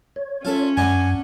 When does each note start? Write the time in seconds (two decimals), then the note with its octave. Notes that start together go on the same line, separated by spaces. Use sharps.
0.16 C#5
0.45 C#4 F4 A4 E5
0.77 F#2 D4 F#5 G#5